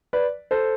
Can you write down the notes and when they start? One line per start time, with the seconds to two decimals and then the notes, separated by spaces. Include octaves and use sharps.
0.13 B4 D5
0.51 A4 C5